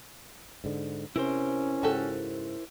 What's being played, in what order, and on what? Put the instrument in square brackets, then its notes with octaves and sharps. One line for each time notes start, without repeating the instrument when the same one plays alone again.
[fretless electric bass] G#2 D3
[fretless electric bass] C3 [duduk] C#4 [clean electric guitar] E4 A#4 C5
[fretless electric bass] G#2 C#3 [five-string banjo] F#4 G4 A4